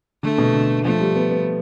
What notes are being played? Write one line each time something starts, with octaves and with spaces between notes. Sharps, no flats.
D3 A3
B2
D3
F3 A3
G3
B3
B3